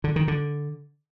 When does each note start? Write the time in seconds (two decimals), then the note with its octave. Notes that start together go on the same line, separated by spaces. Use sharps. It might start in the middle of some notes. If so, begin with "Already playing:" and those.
0.04 D3
0.16 D#3
0.28 D3